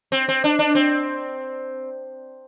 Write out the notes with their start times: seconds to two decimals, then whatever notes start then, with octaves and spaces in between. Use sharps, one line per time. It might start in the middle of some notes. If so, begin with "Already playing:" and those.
0.12 C4
0.28 C4
0.44 D4
0.59 D4
0.75 C4